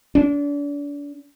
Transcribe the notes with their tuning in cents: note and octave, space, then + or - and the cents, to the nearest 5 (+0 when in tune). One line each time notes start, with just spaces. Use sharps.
D4 -35